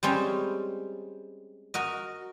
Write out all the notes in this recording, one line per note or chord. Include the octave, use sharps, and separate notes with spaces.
G3 G#3 C4 C#4
F#4 A#4 D#5